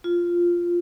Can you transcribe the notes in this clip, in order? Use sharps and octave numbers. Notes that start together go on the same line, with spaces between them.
F4